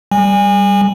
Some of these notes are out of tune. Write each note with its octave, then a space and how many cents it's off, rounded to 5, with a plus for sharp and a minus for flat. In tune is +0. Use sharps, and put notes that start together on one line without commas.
G3 +0 G#5 -25